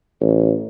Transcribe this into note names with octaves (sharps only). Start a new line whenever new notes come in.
A1